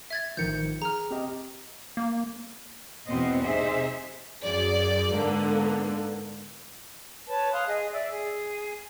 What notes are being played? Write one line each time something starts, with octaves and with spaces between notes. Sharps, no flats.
E5 G#6 A6
A1 D#3 F3 G6 C#7
G#4 A#5 F6
C4 G4 D#5
A#3
E2 B2 B3 C4 C5 D#5
C3 D#4 G#4 C5 E5
F#2 G#4 D5
G#2 D3 A#3 B3
B4 C#5 A5
F5 C6 D#6 F#6
G#4 D#5
D5 E5
G#4